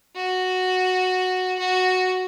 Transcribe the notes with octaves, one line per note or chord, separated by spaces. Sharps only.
F#4
F#4